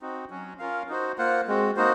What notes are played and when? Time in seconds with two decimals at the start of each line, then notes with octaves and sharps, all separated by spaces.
0.02 C4 D#4 F#4
0.30 F#3 C#4 F#4
0.59 C#4 F4 A#4 F5
0.89 D#4 F#4 C5
1.18 A#3 F4 C5 F#5
1.48 G#3 C4 F#4
1.76 A#3 D#4 F#4 C5